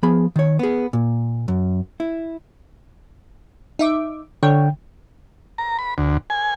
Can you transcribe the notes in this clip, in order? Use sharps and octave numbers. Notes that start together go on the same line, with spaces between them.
F3 B3 G#4 B5
D#3 C#5
B3 G#4
A#2
F#2
E4
D#4 E5 D6
D3 C#5 G5
A#5
B5
D2
G#5